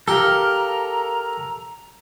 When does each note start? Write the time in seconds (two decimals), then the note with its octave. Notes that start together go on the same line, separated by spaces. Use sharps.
0.08 G4 A4 A#4 F5 A#5